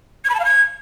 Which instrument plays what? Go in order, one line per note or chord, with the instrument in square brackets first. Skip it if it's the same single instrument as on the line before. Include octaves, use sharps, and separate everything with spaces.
[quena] G#6
B5
A5
F5
G#6